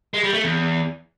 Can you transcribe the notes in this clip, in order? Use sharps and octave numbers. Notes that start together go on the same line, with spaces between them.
G#3
G3
A3
E2